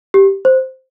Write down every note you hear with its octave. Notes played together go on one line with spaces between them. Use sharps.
G4
C5